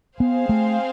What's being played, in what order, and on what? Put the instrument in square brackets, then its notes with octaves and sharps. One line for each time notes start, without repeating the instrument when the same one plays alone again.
[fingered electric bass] B3 [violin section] C4 G#4 C5 F5
[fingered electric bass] A3